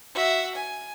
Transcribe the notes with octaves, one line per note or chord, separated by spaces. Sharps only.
F#4 E5
G#5